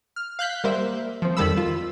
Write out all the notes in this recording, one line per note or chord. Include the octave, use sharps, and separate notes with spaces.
F6
F5 F#6 G6 B6
G3 A#3 C5 E5
F3 C4
F2 D#3 G3 A4 B5 E6
F4